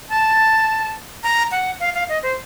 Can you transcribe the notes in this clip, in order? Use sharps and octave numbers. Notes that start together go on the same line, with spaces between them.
A5
A#5
F#5
F5
F5
D#5
C5